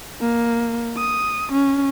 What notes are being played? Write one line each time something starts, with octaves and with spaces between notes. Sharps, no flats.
A#3
D#6
C#4